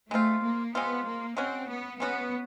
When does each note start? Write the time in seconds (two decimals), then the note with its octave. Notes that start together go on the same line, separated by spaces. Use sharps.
0.11 G#3 A3 C4 F4
0.43 A#3
0.75 G#3 B3 C4 F4
1.05 A#3
1.37 G#3 C4 C#4 F#4
1.68 B3
1.99 G#3 B3 C#4 F#4